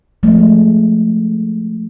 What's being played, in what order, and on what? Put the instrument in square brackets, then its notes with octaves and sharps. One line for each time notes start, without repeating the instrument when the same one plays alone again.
[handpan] F3 G#3 A3